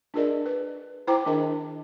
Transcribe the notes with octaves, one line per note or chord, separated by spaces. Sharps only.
D4 F4 G#4 A#4 D5 D#5
B4
E4 C5 G5 A#5 D6
D#3 D4 G#4 A#4 D#5